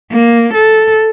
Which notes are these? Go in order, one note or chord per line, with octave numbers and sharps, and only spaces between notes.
A#3
A4